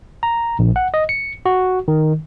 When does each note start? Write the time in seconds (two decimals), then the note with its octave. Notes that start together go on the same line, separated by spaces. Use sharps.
0.23 A#5
0.59 A#1
0.76 F#5
0.94 D#5
1.09 C#7
1.46 F#4
1.88 D#3